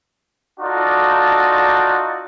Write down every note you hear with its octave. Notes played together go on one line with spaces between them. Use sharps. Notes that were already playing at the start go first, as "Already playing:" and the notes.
D#4 F4 F#4 A4 D5